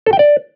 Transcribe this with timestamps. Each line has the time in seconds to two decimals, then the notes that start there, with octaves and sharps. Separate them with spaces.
0.06 A4
0.13 G5
0.19 D5